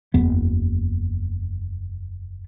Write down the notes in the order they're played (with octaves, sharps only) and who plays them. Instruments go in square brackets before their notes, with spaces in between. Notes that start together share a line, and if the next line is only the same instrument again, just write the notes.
[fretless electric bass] F#1 E2 B3